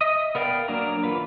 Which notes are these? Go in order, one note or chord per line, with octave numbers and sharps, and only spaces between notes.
D#5 E5 D#6
B3 A#4 D5 F5 G5
F#3 A#3 D4 A#4 A#5
E3 F4 B4